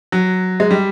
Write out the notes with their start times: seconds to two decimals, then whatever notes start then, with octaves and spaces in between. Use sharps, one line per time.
0.12 F#3
0.60 G#3
0.71 G3